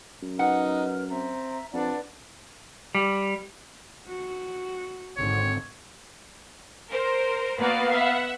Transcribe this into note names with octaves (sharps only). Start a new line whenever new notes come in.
F#2
D#4 B4 F#5 F6
C4 E5 A#5
F2 D4 B4 D5 F#5
G3
F#4
G#1 D3 C4 C#5
A#4 C5
A#3 B3 F#4 D5 F5
E5 F#5